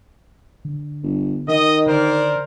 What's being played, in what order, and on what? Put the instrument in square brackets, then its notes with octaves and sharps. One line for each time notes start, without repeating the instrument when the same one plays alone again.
[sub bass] D3
[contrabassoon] G1
[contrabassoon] D#3 [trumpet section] D#5
[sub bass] D3 [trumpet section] A#4 C5 D5